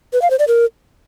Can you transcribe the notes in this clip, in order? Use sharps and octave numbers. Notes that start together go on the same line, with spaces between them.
B4
F5
C5
D5
A#4